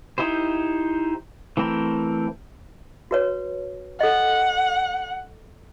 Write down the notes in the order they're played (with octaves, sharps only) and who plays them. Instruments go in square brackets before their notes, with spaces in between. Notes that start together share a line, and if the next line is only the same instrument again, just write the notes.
[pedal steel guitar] D#4 E4 G4 C5
E3 A3 C4 A#4
[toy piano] F#4 B4 C#5
[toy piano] A4 D#5 [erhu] F#5